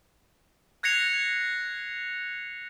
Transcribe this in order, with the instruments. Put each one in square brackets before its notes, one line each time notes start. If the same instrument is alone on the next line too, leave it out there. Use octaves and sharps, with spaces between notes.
[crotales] F#6 G#6 A#6 C7 C#7 F7